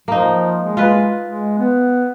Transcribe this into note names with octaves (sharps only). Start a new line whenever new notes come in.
F3 A#3 D#4
G#3
F4 B4
G#3
B3